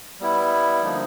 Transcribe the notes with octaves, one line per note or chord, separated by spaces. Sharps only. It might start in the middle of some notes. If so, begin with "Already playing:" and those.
G3 B3 E4
D3 F3 A#3 D#4